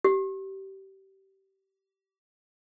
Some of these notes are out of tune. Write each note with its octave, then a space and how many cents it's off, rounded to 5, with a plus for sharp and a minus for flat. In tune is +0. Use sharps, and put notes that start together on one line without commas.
G4 -25